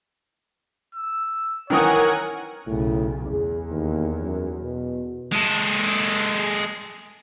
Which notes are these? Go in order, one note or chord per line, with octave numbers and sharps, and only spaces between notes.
E6
D#3 E3 A#4 C#5 F#5 G#5 D#6
B1 A2 C#3
E2 G#4
D#2
F#2
B2
G#3 A4